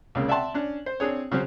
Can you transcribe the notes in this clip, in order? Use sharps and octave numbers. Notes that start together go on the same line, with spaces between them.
C#2 C#3 A#3
D5 E5 F#5 G5 A5 C6
C#4 D4
C5
C4 D4 G#4 C#5
C#3 F#3 C#4 C5